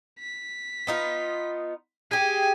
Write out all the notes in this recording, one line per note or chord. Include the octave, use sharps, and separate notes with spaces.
B6
B3 D#4 F4
G4 G#4 G#5